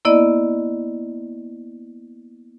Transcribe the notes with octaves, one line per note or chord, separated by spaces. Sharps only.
A#3 B3 E4 D5 D#5